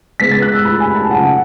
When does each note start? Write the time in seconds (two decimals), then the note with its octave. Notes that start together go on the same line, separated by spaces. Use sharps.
0.20 C#3 G#3 B3 B6
0.31 A6
0.42 F#6
0.53 E6
0.65 B5
0.80 G#5
0.95 A5
1.10 C#3 F#3 C#4 F#5